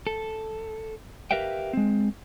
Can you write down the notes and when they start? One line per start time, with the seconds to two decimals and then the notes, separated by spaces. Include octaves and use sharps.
0.07 A4
1.31 G4 A#4 B4 E5 F5 G5
1.73 G#3 C4